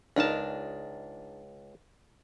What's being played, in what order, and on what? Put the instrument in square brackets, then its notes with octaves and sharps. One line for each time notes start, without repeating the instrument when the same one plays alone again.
[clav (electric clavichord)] C#2 A5 [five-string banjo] D4 D#4 A#4